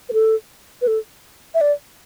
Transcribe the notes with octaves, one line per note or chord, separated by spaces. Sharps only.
B4
A4
B4
A4
E5
D5